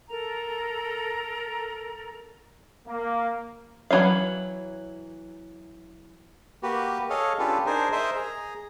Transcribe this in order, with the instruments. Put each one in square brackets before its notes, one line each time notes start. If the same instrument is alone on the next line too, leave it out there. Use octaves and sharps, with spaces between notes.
[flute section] A4 A#4 A#5
[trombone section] A#3
[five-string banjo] E3 F#3 D#4 C#5 F5
[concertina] A#3 F#4 G4 B4
G#4 A4 C#5 D#5 F5
C#4 D4 F4 G4 A4 B4
D4 D#4 G#4 A#4 C5
A#4 C5 D#5 E5
G#4 A#5